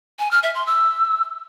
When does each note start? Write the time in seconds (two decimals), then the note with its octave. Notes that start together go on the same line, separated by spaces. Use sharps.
0.19 G#5
0.31 F6
0.43 E5
0.55 C6
0.67 E6